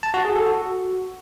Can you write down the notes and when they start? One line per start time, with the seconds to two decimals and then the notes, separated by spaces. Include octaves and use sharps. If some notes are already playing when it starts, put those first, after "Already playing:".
0.03 A5
0.14 F#4
0.25 G#4
0.36 A4
0.46 F#4